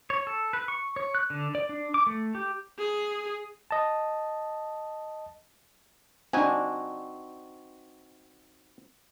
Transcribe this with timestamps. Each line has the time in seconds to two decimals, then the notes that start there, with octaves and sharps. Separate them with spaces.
0.10 C#5
0.27 A4
0.53 B4
0.68 C#6
0.96 C#5
1.15 F#6
1.30 D3
1.55 D5
1.69 D4
1.94 D6
2.07 A3
2.35 G4
2.78 G#4
3.71 D#5 A5
6.33 C4 D4 D#4 F#4 G#5